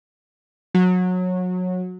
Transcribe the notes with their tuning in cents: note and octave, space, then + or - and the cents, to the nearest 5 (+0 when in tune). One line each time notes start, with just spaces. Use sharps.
F#3 -25